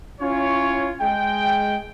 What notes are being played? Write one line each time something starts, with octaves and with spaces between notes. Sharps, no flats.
C#4 E4 F4 C#5
G#3 G5